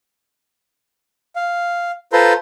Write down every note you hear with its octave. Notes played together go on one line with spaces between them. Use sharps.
F5
F4 A4 B4 C5 A#5 C6